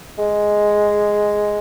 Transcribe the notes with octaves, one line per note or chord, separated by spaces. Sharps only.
G#3